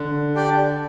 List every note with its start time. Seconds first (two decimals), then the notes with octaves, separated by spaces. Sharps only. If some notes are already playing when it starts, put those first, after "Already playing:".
Already playing: D3
0.35 D4 G4 D5 G5